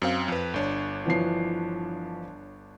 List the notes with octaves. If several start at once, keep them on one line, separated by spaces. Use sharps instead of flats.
F#2 C4 F5
F2 B4
G1 D4 C#5
E3 F3 C7